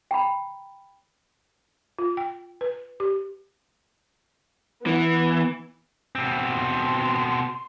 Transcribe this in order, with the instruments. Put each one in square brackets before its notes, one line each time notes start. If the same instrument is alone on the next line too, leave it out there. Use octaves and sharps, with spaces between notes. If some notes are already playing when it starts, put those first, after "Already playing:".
[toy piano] G5 A#5 B5
[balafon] F4
G5
B4
G4
[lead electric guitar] E3 [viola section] B3
[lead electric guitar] B2 C4
[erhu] C6